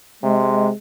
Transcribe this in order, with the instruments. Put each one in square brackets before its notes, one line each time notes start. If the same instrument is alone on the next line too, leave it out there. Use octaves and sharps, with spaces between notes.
[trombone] C3 [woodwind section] G#3